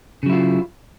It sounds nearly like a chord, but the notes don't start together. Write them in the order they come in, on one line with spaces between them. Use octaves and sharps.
C#3 F#3 E4 F4